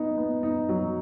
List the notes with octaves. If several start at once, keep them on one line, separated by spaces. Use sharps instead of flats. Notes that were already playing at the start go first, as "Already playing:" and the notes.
Already playing: B3 D#4
B3
D#4
F#3